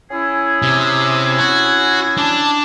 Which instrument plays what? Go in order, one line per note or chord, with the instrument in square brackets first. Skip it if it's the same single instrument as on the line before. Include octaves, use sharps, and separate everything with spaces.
[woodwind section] C#4 E4 G#4
[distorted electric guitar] C3
F#4
D4